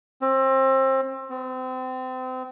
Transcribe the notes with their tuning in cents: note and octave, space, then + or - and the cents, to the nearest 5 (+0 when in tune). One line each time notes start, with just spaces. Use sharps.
C4 +30
C4 -30